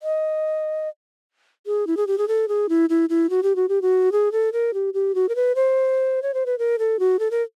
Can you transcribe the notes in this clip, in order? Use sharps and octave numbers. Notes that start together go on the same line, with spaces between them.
D#5
G#4
E4
G#4
G4
G#4
A4
G#4
E4
E4
E4
F#4
G4
F#4
G4
F#4
G#4
A4
A#4
G4
G4
F#4
A#4
B4
C5
C#5
C5
B4
A#4
A4
F#4
A4
A#4